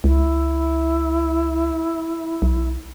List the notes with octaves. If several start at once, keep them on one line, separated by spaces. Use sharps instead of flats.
C#2 E4
B1